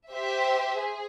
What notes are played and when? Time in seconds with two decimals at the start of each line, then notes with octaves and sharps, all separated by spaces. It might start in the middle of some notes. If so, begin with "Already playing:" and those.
0.11 G4 C5 E5
0.78 G#4